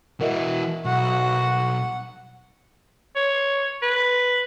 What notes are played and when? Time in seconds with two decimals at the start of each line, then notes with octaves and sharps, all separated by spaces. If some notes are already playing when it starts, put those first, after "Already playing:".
0.21 E3 F#4 A#4 D#5 E5
0.85 B1 F#4 F#5
3.16 C#5
3.82 B4